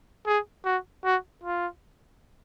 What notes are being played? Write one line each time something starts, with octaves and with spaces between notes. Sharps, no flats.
G#4
F#4
F#4
F4